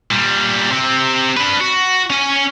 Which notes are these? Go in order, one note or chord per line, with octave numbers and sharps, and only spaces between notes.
A#2 G3
C3 C4
D4 B4
F#4
C#4 G#5